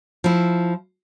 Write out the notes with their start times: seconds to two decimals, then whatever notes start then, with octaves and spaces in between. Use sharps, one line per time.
0.24 F3 E4